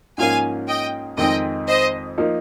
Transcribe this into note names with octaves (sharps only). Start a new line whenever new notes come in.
G#2 F3 A#3 C#4 F5 G#5
D#5 G5
F2 D#3 G#3 C4 D#4 D#5 G5
C5 D#5
F3 A#3 D#4